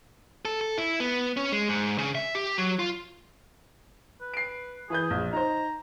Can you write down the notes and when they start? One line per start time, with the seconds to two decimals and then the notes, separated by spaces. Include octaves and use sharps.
0.45 A4
0.61 A4
0.78 E4
1.00 B3
1.37 C#4
1.52 G#3
1.68 G#2
1.98 C#3
2.15 E5
2.35 G4
2.58 F#3
2.79 F4
4.21 B4
4.34 C7 D7
4.90 E3 G#4 B4 G6
5.10 A#1
5.33 D#4 C5 A#5